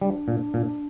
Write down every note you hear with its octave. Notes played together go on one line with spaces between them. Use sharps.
G3 D4
A#2
A#2